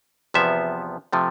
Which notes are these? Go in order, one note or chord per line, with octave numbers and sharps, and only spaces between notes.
E2 C3 F3 B3 E5
C3 F3 A3